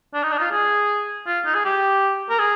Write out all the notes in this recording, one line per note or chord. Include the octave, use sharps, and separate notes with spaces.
D4
D#4
D4
D#4
F4
G#4
F4
D#4
G#4
G4
A#4
G#4